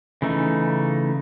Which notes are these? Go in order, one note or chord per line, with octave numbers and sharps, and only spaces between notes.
C#3 E3 A3 D#4